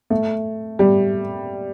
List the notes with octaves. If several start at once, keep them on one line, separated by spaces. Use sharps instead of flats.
A3
G3